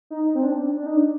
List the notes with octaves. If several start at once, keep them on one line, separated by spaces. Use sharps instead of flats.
D#4
C4
D4
D4
D#4
D4